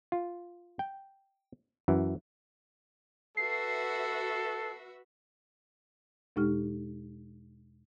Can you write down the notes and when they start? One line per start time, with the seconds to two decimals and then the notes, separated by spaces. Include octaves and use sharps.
0.12 F4
0.79 G5
1.88 F#2 E3
3.37 F#4 A4 B4 E5 C7
6.36 E2 B2 G#3 D#4 G4 F6